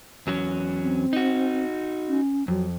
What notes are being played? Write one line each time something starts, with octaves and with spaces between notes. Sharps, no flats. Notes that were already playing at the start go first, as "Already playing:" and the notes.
E2 F#3 C#4
C4
D#4 F#4
C#4
F2 F#3